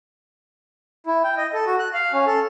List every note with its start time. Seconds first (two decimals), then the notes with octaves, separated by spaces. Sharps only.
1.06 E4
1.24 G5
1.37 D#5
1.53 A4
1.66 F#4
1.79 F#6
1.94 F5
2.13 C#4
2.26 A4